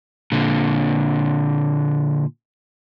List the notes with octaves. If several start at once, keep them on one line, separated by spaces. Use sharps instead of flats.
A#2 D3